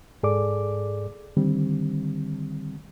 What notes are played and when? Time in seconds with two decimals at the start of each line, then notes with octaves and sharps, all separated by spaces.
0.23 G#2 G#4 A4 D5 D6
1.37 D3 D#3 G3 C4